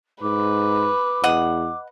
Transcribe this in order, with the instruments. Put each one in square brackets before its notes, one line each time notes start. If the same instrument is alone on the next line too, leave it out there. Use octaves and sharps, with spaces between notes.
[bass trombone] G#2 [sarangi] B4 [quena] D6
[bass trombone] E2 [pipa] D#5 F#5